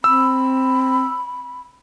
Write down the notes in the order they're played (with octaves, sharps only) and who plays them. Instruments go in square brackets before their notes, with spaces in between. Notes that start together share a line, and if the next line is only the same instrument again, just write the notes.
[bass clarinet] C4 [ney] B5 [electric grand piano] E6